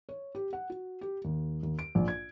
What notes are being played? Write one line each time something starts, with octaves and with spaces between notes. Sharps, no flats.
C#5
G4
F#5
F#4
G4
D#2
D#2
D7
A#1
G#6